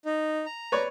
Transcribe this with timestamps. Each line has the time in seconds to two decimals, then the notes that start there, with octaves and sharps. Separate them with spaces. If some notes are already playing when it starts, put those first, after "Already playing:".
0.05 D#4
0.46 A#5
0.72 B4 C#5 D5